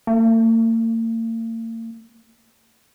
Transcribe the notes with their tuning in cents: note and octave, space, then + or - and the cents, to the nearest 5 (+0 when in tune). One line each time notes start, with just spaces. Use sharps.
A#3 -45